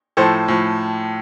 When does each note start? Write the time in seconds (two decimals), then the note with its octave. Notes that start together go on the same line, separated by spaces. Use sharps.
0.17 A2 F3 A4 C5
0.48 A2 F3